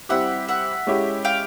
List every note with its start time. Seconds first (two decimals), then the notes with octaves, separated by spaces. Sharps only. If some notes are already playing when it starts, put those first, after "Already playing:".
0.09 G3 C4 E4 G4 E5 F#5
0.48 E5 F#5
0.87 G#3 C#4 E4 G4
1.25 F5 G5